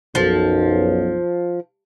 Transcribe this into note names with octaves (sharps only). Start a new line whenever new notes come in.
B1 F#2 F3